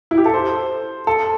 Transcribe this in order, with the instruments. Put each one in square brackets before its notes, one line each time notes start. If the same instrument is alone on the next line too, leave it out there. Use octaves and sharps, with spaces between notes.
[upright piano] E4
G4
A4
C5
A4